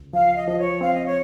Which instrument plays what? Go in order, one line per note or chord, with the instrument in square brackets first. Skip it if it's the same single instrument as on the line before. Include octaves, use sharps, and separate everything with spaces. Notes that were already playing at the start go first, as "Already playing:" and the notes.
Already playing: [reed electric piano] C#2
[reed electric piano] F3 [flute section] F5
[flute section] D#5
[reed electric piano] F3 [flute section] D#5
[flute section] C#5
[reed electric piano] C4 [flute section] F5
[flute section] D#5
C#5